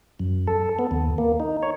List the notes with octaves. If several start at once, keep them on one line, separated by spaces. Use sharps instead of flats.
F#2
A4
B3
D#2
A#3
D#4
C#5